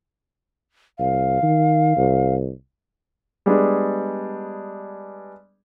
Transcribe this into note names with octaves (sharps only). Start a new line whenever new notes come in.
C2 F5
D#3
C2
G3 G#3 B3 D4 G#4